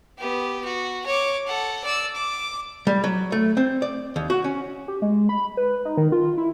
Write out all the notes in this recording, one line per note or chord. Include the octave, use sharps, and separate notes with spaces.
B3 G4
F#4
C#5 D6
A4 F#5
D5 E6
D6
G3
F#3
A3
C4
D5
D#2
F#4
C#4
G4
G#3
B5
B4
D#4
D#3
F4
E4